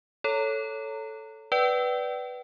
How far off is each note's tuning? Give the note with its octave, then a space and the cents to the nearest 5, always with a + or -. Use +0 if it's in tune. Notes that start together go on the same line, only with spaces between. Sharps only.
A4 +0 C#5 +0 A#5 -30
B4 +0 D5 +0 G5 -40